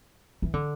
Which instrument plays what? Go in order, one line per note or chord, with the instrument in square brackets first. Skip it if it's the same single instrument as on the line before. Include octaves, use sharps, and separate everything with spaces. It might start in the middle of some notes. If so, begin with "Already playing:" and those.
[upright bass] E3
D3